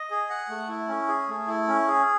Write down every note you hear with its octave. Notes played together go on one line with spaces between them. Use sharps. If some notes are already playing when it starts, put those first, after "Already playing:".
Already playing: D#5
G#4
F#5
A3
E4
C#4
G#4
A3
E4
C#4
G#4